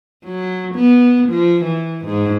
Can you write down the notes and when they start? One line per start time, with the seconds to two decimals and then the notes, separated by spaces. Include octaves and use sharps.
0.25 F#3
0.75 B3
1.29 F3
1.64 E3
2.06 G#2